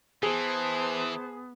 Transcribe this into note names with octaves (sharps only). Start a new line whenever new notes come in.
E3 B3 G#4 C5 A5